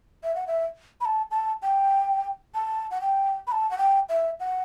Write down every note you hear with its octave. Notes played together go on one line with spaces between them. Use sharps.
E5
F#5
E5
B5
A5
A5
G5
A5
F#5
G5
B5
A5
F#5
G5
E5
F#5